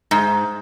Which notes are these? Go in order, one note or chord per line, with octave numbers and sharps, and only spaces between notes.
G#2